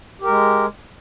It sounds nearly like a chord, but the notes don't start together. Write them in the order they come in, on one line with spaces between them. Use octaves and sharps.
G4 A#4 G#3